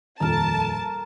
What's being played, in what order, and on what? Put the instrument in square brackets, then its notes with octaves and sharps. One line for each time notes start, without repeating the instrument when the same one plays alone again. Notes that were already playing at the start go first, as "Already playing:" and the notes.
[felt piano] D#1 F2 [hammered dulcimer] A#4 A#5 [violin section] A5